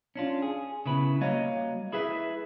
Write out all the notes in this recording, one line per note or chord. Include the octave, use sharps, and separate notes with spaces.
C#4 D4 F4
G#4
C#3 B3 E4 B4
G3 A#3 F#4 C#5 D#5 F5
E4 G#4 B4 E5